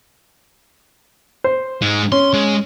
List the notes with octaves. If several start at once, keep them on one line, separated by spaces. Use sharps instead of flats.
C5
G#2 G#3
C#4 C6
G#3